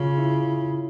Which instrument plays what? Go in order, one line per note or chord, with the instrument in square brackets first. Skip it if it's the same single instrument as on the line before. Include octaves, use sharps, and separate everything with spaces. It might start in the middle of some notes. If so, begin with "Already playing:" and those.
Already playing: [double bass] C#3 [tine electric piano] F4
[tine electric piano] E4